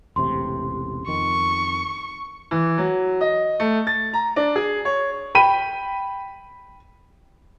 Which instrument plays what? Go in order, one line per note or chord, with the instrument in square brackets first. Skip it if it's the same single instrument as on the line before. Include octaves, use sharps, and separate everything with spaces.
[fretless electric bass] E1 A1 C3 [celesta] C6
[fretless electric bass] F2 D#3 [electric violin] C#6
[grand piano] E3
F#3
D#5
A3
A6
A#5
D4
G#4
C#5
[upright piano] G5 B5 D#7